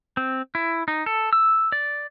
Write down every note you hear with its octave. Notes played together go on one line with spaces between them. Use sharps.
C4
E4
D#4
A4
E6
D5